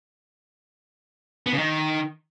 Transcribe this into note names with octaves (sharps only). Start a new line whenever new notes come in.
B3
C#3
D#3